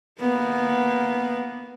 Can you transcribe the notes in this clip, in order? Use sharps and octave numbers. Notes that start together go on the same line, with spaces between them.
A#3 B3